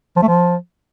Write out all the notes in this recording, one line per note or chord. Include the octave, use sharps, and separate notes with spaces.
F3
A3
F3